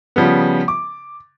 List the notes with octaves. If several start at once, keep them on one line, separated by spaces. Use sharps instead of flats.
C#3 F3 G3 B3
D6